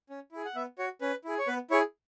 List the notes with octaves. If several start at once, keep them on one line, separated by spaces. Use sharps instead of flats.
C#4
E4 G#4
F#5
B3 E5
F#4 C#5
C#4 B4
E4 G#4
C#5
B3 B4
E4 G#4 C#5